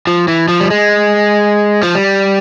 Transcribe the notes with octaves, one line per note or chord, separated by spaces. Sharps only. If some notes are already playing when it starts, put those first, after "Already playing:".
F3
E3
F3
G3
G#3
F3
G3